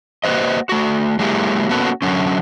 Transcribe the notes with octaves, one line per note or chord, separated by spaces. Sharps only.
A#3 F#4 B4 C5 D#5
A3 F#4
F#3 G#3 A#3 E4 G4
A#3 B3 C#4 F#4 A4 B4
D3 F#3 C#4